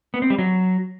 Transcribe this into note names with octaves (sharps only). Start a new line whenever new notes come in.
B3
C4
G3
F#3